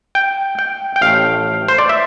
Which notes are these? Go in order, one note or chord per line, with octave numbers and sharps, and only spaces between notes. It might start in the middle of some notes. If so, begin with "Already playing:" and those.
G5
G5
G5
A1 A2 F3 A3 F5
C5
D5
E5